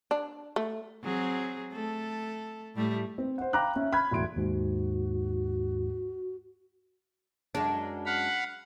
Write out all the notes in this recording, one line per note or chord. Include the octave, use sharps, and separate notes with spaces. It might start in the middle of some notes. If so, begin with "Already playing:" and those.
D4
A3
F#3 C4 G#4
A3 A4
A2 G3 A3
C4
C5 F#5
F5 G5 A#5 B5 D6 F#6
C#4 E5
B5 F6 F#6 G#6
E1 A2 C6 D7
D#2 G#2 F#4
F#2 G#3 D4
F5 F#5 B5